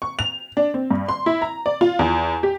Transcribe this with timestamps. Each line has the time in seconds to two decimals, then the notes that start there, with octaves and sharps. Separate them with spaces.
0.02 C#6
0.19 F7
0.57 D4
0.74 C4
0.91 G2
1.09 C6
1.26 E4
1.42 A#5
1.66 D5
1.81 F4
1.99 E2
2.43 G4